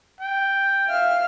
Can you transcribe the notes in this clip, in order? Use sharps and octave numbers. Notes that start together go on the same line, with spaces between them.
G5
E5 F5 F6